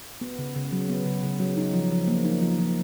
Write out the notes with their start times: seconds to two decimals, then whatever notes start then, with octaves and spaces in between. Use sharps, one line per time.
0.21 B3
0.39 C#3
0.56 C#3
0.72 F#3
0.90 B3
1.06 C#3
1.23 C#3
1.40 F#3
1.57 D#4
1.73 F3
1.91 F3
2.07 A#3
2.25 D#4
2.41 F3
2.58 F3